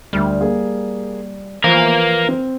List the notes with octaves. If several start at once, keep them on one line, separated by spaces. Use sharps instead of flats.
D2 G3 F6
A#3 G#4
E3 F3 A#4 C5 F5
C4